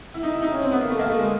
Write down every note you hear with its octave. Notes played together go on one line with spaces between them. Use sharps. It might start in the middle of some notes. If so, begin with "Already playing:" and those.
E4
D#4
E4
D#4
C#4
C4
B3
A#3
A3
A#3
A3
G#3